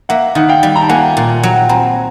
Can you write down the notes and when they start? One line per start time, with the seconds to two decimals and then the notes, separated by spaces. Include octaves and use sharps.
0.09 A#3 E5 F#5
0.35 D#3 F#5
0.49 F5 G5
0.63 G3
0.76 A#5
0.82 A5
0.89 A#3 F#5 G#5
1.17 A#2
1.43 F#3
1.69 C4 G#5 A#5